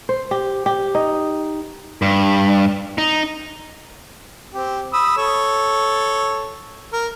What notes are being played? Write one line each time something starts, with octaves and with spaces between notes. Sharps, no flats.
C5
G4
G4
D#4
G2
D#4
C4 G4
B5 D#6 E6
A4 C#5
A#4